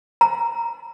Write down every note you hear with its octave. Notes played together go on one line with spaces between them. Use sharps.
A#5